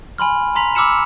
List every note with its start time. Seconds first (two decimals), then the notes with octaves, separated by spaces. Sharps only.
0.18 G#5 B5 C6 F6
0.55 A#5 C6 B6 F7
0.75 B5 D6 E6 F6 C#7 E7